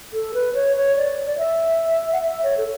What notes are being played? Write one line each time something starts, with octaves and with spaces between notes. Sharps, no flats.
A4
B4
C#5
C#5
D5
D5
E5
F#5
E5
C#5
A4